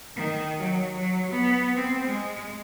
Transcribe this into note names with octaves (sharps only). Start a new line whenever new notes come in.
D#3
F#3
F#3
B3
C4
G#3